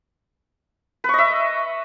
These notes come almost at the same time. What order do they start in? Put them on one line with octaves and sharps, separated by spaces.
B4 C#6 D#5 E5